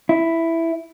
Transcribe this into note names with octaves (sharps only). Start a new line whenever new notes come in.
E4